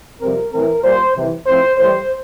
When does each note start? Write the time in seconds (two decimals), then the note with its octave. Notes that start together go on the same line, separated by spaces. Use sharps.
0.21 F2 C3 G3 C4 A#4
0.52 A2 E3 A3 C4 A#4
0.84 A#2 G3 A#3 C5
1.15 C2 C3 E3
1.46 A2 F3 A3 C4 C5
1.78 A2 E3 G3 C5